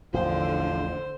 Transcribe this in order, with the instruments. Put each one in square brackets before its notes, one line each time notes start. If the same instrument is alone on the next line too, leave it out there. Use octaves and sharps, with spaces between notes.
[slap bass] A1 E2 [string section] D3 [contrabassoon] F3 [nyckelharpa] C5